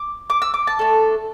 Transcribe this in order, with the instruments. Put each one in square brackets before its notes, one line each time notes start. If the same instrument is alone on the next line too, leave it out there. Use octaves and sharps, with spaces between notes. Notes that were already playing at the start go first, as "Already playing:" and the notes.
Already playing: [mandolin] D6
D6
E6
D6
A5
A3 D4 A4